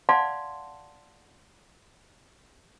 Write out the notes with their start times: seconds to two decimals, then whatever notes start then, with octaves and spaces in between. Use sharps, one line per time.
0.09 D5 F5 F#5 A5 C6